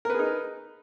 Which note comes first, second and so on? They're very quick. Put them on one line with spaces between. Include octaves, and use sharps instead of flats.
A#4 B4 G#4 D#4